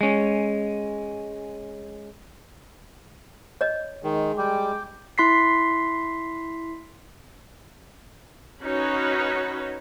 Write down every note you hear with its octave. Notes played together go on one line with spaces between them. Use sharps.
G#3 C#4
C#5 D#5
D#3 G#3
G3 G5 D6
E4 C6 B6 C7
C#4 D#4 F#4 B4 C#5